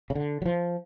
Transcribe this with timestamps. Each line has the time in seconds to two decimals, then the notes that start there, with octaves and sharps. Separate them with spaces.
0.10 C#3
0.15 D3
0.42 F#3
0.46 F3